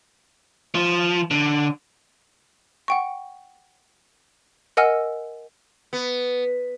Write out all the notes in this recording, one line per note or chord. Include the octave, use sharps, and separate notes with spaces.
F3
D3
F#5 G5 C#6
A#4 D#5 F#5 G#5 E6 F6
B3